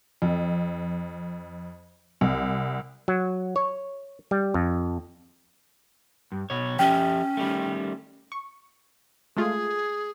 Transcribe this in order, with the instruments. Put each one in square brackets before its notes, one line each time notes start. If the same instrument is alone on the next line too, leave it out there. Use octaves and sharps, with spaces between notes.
[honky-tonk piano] F2
C2
[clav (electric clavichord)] F#3
C#5
G3
F2
[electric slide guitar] G2
B2 C#5
[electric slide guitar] F3 G4 E5 [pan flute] C#4 [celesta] G5
[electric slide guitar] D#3 G3 A3
[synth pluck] C#6
[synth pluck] G#3 A3 F4 [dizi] G#4